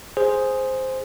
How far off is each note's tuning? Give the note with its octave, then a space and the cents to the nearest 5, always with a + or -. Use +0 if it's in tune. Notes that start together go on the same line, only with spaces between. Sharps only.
G#4 +0 C5 +0